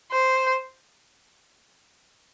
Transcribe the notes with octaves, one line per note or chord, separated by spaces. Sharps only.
C5